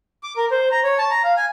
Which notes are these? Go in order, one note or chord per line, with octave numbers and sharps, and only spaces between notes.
D6
A#4
C5
A#5
C#5
A5
A#5
F5
G#5